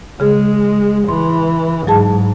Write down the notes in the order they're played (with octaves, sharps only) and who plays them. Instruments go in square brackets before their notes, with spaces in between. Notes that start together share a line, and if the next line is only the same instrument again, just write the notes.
[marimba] C#3 G#4 [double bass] G#3
[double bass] E3 [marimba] C6
[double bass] G#2 [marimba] F#3 G#4 A5